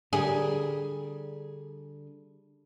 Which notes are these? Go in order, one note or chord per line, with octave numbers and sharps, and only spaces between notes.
D3 G3 G#4 A#4